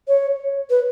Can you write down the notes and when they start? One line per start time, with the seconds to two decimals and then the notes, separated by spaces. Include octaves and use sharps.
0.08 C#5
0.70 B4